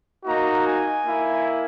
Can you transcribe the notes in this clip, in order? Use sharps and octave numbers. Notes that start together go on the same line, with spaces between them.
A#3 D#4 F#4 A#5
G#5
A#3 E4